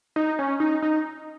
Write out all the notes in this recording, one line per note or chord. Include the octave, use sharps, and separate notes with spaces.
D#4
C#4
D#4
D#4